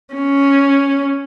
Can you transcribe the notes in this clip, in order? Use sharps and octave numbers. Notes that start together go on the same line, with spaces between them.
C#4